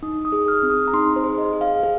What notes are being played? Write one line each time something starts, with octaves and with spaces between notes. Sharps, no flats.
D#4 D#6
D#6
G#4
F6
C4
D#6
A#5
D#4 C6
C5
G#4
D#5
G#4
F5
G#4